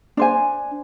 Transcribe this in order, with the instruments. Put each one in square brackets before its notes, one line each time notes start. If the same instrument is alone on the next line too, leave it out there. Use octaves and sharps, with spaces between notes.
[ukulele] D4 C5 G#5